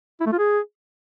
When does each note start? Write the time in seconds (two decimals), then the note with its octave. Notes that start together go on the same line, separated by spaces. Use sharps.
0.20 E4
0.26 A3
0.32 F4
0.38 G#4